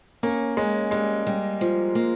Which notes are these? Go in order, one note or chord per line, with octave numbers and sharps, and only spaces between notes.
A#3 C#4
G#3 C#4
G3 G#3
G3
F3
A#3